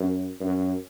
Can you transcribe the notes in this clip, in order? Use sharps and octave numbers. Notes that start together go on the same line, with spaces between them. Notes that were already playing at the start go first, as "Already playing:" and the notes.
Already playing: F#2
F#2